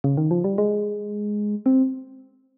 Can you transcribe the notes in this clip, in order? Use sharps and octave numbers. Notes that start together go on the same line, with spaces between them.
C#3
D#3
F3
G3
G#3
C4